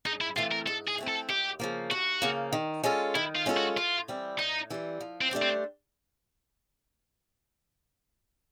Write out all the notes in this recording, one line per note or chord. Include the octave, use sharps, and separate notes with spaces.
G#2 D#4
E4
E3 A3 C4 F4
A#4
G#2 A4
G#4
E3 A3 C4
A4
D#2 G4
C#3 F3 A#3
D#2 F#4
C#3 F3 A#3
D#3
G#3 C#4 F4 A4
D#3 E4
F4
G#3 C#4 F4 A4
F#4
A2 F4
E3 G3 C4
A2 D#4
E3 G3 C4
F3
C4
A3 D4 G4 C5
C4